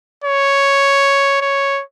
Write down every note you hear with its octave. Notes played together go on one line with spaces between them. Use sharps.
C#5
C#5